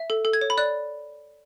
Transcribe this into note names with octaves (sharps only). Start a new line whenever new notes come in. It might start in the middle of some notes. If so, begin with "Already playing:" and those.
Already playing: E5
A4
A4
G#6
C#5
B5
D5 F#6